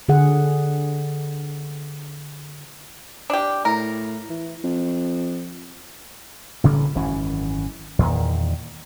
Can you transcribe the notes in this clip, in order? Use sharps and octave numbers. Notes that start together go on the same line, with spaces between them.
D3 G#4 F#5
D4 G4
A2 A#4
E3
F2
A1 C#3 G3 A#3
G#1 F#2 E3 C#4
E2 A#2 D#3